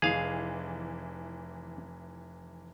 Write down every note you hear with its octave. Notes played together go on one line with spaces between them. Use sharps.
F1 E3 G#4 F5